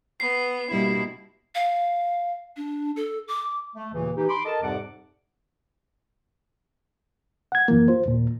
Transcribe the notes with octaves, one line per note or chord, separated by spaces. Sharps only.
B3 C7
B2 G3 A#3 D4 E4
F5
D4
A4
D6
A3
D#2 A#2 C#3 E3
E3 D#4 G4
B5 C6 D6
A4 A#4 D#5 A5
F2 G#2 C3 G3 F#5 D6
F#5 G#6
F#2 E3 A#3
F4 C5
D#2 A#2